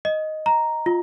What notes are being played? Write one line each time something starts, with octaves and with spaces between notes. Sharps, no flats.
D#5
A#5
F4